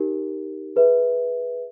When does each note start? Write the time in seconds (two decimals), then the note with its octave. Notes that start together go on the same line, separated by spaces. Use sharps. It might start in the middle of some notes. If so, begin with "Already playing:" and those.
Already playing: D#4 G4 A#4
0.76 G#4 B4 E5